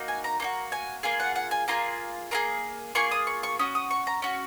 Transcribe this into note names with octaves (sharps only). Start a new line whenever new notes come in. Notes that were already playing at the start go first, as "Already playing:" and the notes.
Already playing: A#3 D#4 F#4
G#5
A#5
A#3 D#4 F#4 A#5
G#5
A#3 F4 G#4 G#5
F#5
F#5
G#5
A#3 F4 G#4 A#5
A#3 F4 G#4 A#5
A#3 F4 G#4 C#6
D#6
C#6
C#6
C#4 F#4 D#6
D#6
C#6
A#5
C#4 F#4